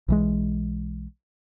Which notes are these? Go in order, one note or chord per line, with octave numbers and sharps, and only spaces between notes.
B1 E3 G#3